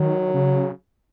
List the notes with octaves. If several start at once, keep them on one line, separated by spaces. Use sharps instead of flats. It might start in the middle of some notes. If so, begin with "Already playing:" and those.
Already playing: D#3 F#3
C#3